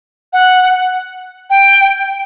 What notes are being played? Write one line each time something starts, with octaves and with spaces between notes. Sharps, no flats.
F#5
G5